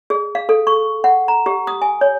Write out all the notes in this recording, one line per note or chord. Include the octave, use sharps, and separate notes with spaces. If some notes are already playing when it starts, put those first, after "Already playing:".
G#4
F5
A4
C#6
F#5
A#5
G4
D#6
G#5
C#5